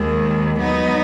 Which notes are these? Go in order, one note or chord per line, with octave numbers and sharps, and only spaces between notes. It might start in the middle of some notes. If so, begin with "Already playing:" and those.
Already playing: D#2 D#3 G#3
F#3 B3 D#4